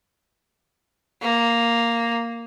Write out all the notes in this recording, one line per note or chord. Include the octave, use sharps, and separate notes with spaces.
A#3